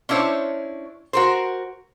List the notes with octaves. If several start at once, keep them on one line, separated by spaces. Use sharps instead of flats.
C#4 D4 E4 C5 C#5
F#4 A#4 C5